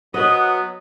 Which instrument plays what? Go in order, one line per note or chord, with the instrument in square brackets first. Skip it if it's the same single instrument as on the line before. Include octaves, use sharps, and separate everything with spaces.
[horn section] F#3 B3 [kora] D#5